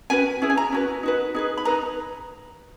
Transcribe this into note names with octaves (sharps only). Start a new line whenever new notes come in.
C#4 F#4 B4 G#5
C#4 E4 G#4
G#5
A#5
C#4 F#4 B4
D#4 F#4 B4
D#4 G#4 B4
B5
D#4 G#4 B4 A#5